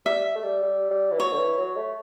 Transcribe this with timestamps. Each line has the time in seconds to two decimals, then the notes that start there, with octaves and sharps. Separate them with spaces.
0.05 G3 E5
0.35 A3
0.44 G3
0.62 G3
0.90 G3
1.11 E3
1.19 F#3 C#5
1.32 D3
1.39 E3
1.58 F#3
1.77 A3